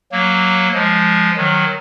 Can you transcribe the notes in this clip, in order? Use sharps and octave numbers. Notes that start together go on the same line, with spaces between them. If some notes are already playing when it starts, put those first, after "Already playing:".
F#3 A#3
F3 G#3
D#3 F#3